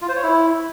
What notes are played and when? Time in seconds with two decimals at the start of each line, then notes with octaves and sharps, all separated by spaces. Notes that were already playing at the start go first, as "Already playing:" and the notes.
0.02 F4
0.09 C5
0.16 C#5
0.23 E4